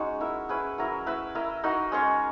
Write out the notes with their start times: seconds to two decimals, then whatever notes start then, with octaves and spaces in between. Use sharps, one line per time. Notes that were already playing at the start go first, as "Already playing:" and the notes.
Already playing: G#3 C#4 D#4 F#4
0.20 E4 A#4 E5
0.49 C#4 E4 G#4 B4
0.78 F#3 C#4 E4 A#4
1.06 E4 B4 E5
1.35 E4 A#4 D#5
1.64 D#4 F#4 A#4 D#5
1.92 G#3 C#4 G#4 C#5